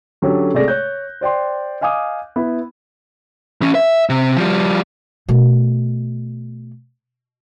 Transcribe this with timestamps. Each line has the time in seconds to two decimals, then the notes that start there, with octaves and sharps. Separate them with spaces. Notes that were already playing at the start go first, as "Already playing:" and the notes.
0.22 D3 F#3 C#4 G4 A4 C#5
0.54 C3 G#3 A3 G#4 D5 A#6
0.68 C#5 F#6 G6
1.21 C5 D5 G5 C6
1.81 D#5 F5 G#5 D6 D#6
2.36 B3 E4
3.61 E3 C#4
3.75 E5
4.09 C3
4.37 F3 G3
5.29 B2 A3